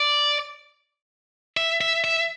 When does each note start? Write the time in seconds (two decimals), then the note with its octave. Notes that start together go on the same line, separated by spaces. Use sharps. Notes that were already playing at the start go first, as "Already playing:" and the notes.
Already playing: D5
1.57 E5
1.81 E5
2.04 E5